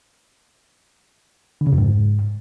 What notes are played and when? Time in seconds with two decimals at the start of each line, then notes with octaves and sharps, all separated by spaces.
1.61 D3
1.67 C#3
1.72 F2
1.78 G#2